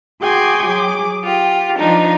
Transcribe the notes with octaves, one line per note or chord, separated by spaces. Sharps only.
F#4 G#4 G5 G#5 C6 D6
F#3 G#4 D6
F4 G4
F3 D4 D#4 F4